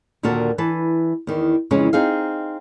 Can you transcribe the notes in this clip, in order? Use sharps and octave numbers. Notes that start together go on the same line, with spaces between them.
D#2 A#2 D3 F#4 A#4 A5
E3 B4 A5
E2 D#3
F2 C#3 E3 G#3 C#4
C4 D#4 G#4 F5